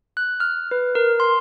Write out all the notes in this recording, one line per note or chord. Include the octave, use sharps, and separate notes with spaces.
F#6
F6
B4
A#4
C6